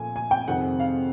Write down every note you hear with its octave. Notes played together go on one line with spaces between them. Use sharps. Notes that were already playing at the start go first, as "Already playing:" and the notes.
Already playing: A#2 F3 A3 G#5
G#5
G5
F2 C3 D#3 G#3 C4 F#5
F5